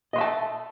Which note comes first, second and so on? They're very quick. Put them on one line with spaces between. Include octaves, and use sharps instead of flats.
D#5 C6 E5 A5